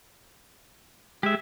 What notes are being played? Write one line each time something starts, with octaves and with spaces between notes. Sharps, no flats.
G#3 G4 E5